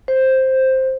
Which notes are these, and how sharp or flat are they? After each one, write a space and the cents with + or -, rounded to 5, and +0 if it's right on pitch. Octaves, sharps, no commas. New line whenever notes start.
C5 +5